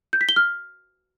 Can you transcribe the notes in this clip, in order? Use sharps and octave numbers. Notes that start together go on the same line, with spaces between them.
G6
B6
G7
F6